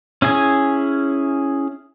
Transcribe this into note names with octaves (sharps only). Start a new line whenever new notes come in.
C#4 E4 G#4 G#5